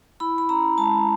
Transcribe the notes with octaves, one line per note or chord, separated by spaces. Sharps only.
E4 B5
B5
C#4 A#5
G#3 A5